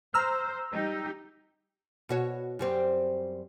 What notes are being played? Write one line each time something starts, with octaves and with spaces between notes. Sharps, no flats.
C5 A#5 E6 F6
G3 D#4 G4
B2 F#4 C#5
F#2 G3 C4